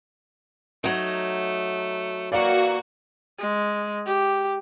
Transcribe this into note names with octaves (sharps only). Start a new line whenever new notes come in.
F#3 A3 D#4
E3 A#3 F#4 D5 F5
G#3
G4